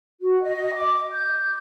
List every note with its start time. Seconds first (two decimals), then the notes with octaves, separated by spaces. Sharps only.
0.21 F#4
0.41 D#5
0.74 D6
1.10 G6